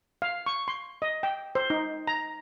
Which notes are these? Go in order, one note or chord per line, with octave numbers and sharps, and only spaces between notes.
F5
C#6
C6
D#5
G5
C5
D#4
A#5